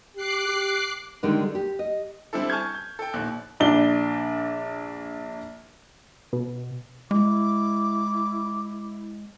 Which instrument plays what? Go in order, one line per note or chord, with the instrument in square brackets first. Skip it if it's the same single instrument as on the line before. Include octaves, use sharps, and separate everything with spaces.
[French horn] G4 [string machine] D6 F#6 C7
[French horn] G4
[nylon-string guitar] D3 D#3 G3 G#3 D4 D#4
G4
D#5
[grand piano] G3 C4 D4 E4 A4
G#5 A5 C#6 F6 G6 G#6
G6
A4 G5
A#1 D#2 F#6
[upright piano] A#1 D4 G7
[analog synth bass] B2
[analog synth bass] G#3 [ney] E4 [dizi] D6